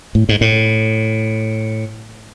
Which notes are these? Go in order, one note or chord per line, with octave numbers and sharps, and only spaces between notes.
A2
G#2
A2